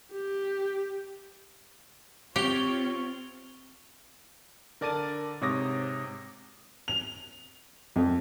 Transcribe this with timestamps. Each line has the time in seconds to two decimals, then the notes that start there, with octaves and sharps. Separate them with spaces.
0.12 G4
2.36 C4 F4 G4 C#5 F7 G7
4.81 D3 A#4 D5 A5 A6 D#7
5.41 G#2 C3 C#5 D6 D#6 A#6
6.88 F7
7.96 F2